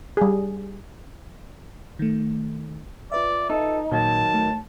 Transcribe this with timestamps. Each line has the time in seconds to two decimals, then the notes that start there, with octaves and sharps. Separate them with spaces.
0.17 G3 G#4
1.99 D#3 A3
3.12 F4 B4 D5 E5
3.50 D#4 A4
3.91 A#2 D#3 F#3 A5 G#6
4.34 A3